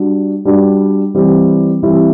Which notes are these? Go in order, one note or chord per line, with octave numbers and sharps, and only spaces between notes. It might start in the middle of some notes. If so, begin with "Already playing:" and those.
Already playing: G3 D4 F#4
G3 D4 F#4
E3 G3 C4 E4 G4
E3 G3 C4 E4 G4